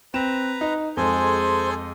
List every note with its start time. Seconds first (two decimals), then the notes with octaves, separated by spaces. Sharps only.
0.14 C4 B4 A#5 E7
0.61 D#4
0.97 F2 G#3 G#4 A4 C5 G#5 C6